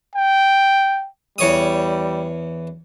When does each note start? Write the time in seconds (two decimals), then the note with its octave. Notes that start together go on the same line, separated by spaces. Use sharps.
0.15 G5
1.38 E2 G3 C#5 D#6